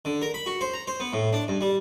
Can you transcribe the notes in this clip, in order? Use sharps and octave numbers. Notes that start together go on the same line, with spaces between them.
D3
A#4
B5
F#4
C5
A#5
C5
B3
A2
D4
G2
G3